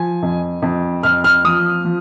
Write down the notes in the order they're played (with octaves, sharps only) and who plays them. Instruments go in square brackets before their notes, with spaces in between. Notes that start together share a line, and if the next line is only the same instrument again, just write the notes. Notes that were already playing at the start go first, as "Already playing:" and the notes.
Already playing: [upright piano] F3 G#5
F2
F2
F2 F6
F6
F3 D#6
F3